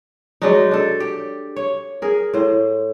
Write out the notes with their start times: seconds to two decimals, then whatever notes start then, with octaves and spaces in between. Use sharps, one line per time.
0.42 F#3 G#3 D4 D#4
0.71 D4 A4
1.00 G4
1.56 C#5
2.02 G#4 A#4
2.34 A2 C5